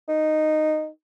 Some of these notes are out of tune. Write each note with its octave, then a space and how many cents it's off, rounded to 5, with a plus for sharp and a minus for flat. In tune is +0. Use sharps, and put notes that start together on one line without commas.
D#4 -10